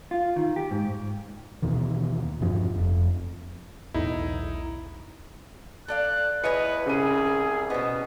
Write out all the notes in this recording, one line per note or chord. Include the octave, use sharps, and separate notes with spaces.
F4
D#3
G4
G#2
D#2 B2 D#3 E3
E2 G2 F3 C#4
F1 F2
B1 E2 A2 D#4 E4
A4 D5 F5 F#6
E2 B4 C#5 D#5 G#5 C#7
C2 C#3 G#4 D#7
B2 B3 D#5